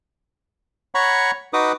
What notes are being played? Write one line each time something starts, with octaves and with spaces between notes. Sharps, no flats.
C#5 F#5 A#5 B5 C#6
D#4 F#4 B4 D6 D#6